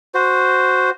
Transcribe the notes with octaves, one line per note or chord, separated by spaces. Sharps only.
F#4 C5